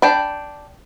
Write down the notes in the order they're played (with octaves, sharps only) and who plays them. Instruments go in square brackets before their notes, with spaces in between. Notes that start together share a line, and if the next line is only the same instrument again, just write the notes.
[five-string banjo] D4 G5 B5